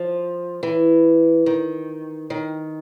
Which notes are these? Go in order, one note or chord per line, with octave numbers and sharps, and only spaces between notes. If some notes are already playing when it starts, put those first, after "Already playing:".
Already playing: F3
E3
D#3
D#3